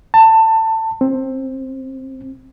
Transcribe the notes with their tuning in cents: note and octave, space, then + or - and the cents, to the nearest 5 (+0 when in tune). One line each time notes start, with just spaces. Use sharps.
A5 +20
C4 +15